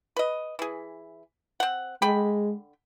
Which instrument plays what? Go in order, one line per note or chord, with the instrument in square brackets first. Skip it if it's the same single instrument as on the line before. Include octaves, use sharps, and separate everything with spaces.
[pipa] B4 D#5
E3 G#4
C4 F#5
[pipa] D3 G5 B5 [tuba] G#3